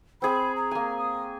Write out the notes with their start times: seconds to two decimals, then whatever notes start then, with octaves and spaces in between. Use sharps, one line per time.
0.22 C4 G#4 B5
0.56 A#5
0.71 A#3 G#5
0.98 D#6